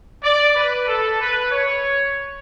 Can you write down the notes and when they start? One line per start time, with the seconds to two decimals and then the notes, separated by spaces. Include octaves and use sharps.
0.23 D5
0.56 B4
0.87 A4
1.20 B4
1.51 C#5